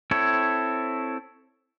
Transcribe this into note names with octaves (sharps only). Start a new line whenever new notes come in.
C4 E4 A4 C#5